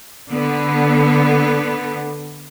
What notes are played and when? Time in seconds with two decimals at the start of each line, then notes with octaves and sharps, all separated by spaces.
0.29 D3 B3